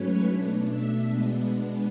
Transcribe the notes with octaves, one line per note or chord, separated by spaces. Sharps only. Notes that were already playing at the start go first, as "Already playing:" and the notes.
Already playing: G#2 F#3 A3 C#4 B4 C#5
B2 A3 D4
E5
B2 G#3 B3 D4